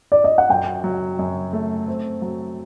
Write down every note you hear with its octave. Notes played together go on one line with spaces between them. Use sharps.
D5
D#5
F#5
F#2 G5
F#3
F#2
A3
C4
F#3